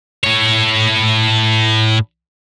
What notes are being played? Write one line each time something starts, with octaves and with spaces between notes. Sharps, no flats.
A2 C#5